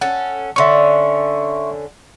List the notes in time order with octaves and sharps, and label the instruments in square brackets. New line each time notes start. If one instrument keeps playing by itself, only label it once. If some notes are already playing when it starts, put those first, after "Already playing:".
[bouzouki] C#4 A4 [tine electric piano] F#5
[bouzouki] D3 C#4 [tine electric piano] E5 C6 C#6